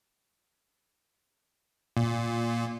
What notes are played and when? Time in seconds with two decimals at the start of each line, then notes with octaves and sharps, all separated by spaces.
1.97 A#2